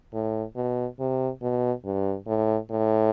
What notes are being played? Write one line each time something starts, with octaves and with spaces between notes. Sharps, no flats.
A2
B2
C3
B2
G2
A2
A2